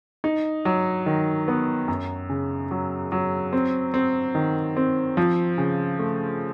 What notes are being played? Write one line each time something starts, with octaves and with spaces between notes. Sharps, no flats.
D#4
F#3
D#3
B3
F#2
C#3
F#3
F#3
C4
C4
D#3
C4
F3
C#3
A3